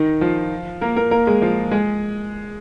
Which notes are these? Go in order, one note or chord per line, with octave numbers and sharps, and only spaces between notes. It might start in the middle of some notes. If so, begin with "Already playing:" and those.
Already playing: D#3 D#4
F3 F4
A#3 A#4
A#3 A#4
A#3 A#4
G#3 G#4
F3 F4
G#3 G#4